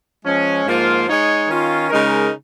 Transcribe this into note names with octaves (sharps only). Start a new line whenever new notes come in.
F3 G#3 C#4
G#2 F3 A#3 F4
G#3 D#4 C#5
D#3 C#4 F4
C#3 G#3 D#4 A#4